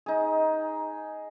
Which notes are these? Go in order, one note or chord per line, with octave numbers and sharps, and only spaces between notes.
D#4 G#4